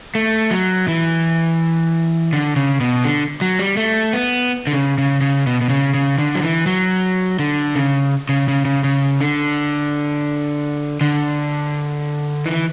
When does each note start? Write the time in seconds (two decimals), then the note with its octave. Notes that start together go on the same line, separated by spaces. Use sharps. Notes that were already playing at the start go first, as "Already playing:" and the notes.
0.15 A3
0.51 F#3
0.88 E3
2.33 D3
2.56 C#3
2.80 B2
3.04 D3
3.41 F#3
3.59 G3
3.77 A3
4.13 B3
4.67 D3
4.73 C#3
4.98 C#3
5.21 C#3
5.47 B2
5.61 B2
5.69 C#3
5.94 C#3
6.18 D3
6.35 F#3
6.42 E3
6.66 F#3
7.39 D3
7.75 C#3
8.29 C#3
8.48 C#3
8.65 C#3
8.84 C#3
9.21 D3
11.01 D3
12.46 E3